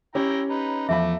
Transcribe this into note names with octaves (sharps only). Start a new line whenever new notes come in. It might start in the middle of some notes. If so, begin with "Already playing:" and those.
C#4 E4 G4 G5 A#5
D#4 B4
E2 F3 A3 E5 F5 B5 D6